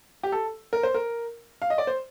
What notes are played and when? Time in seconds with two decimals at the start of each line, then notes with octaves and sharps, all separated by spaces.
0.23 G4
0.32 A4
0.73 A#4
0.83 C5
0.94 A#4
1.62 F5
1.70 D#5
1.78 D5
1.87 C5